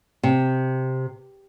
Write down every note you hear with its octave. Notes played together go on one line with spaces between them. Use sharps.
C3